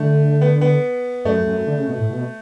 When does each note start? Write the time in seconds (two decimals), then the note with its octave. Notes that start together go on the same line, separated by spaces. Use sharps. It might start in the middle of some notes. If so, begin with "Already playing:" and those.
Already playing: D3 A3
0.41 B3
0.61 B3
1.25 F#2 A3
1.46 F#2
1.67 D3
1.78 C#3
1.88 B2
1.99 A2
2.09 B2